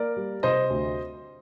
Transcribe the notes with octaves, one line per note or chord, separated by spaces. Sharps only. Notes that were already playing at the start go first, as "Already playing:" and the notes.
Already playing: A#3 A#4 D5
G3
C3 C5 D#5
D2